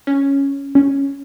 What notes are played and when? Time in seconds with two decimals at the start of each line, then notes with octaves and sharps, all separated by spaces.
0.07 C#4
0.75 C#4